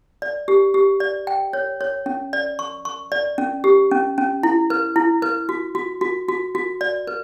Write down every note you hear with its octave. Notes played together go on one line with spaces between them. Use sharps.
D5
G4
G4
D5
G5
C#5
C#5
C#4
D5
C#6
C#6
D5
C#4
G4
C#4
C#4
E4
B4
E4
B4
F#4
F#4
F#4
F#4
F#4
D5
B4